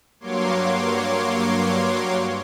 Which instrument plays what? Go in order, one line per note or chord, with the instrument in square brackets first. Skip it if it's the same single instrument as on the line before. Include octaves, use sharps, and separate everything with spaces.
[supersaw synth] G2 F#3 A#3 C#5 C6 D6